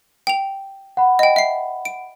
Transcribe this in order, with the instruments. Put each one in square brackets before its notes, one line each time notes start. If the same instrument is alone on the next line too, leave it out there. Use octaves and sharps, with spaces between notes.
[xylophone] G5 F7
[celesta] F#5 B5
[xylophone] D#5 G5
E5 C7
D7